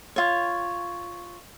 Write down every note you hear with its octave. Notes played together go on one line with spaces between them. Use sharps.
F4 C#5